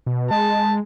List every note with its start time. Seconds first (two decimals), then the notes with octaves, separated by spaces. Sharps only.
0.06 B2
0.31 G#3 A5